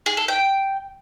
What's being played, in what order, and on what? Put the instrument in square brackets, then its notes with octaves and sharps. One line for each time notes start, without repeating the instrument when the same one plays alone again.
[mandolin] G#4
A4
G5